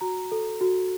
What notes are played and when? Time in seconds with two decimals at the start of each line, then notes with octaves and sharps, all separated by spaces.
0.01 F#4 A#5
0.32 A4
0.61 F#4